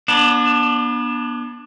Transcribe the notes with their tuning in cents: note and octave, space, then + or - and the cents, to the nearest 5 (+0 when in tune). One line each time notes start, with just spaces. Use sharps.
B3 -40 D4 +0